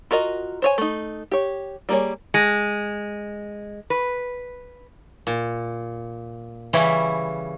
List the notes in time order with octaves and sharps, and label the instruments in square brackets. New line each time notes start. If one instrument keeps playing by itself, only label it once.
[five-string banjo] F4 F#4 A#4 D#5
C5 C#5 G#5
A3 D#4
G4 C#5
G3 A#3 G#4 C#5
[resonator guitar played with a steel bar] G#3
B4
[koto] A#2
C#3 E3 G3 C#4 E4